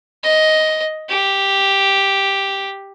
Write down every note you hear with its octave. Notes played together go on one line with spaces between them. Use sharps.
D#5
G4